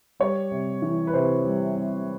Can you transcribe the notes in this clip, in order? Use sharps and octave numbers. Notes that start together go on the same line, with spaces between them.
G3 C#5
C3
E3
B4
C3 C5
G3
C3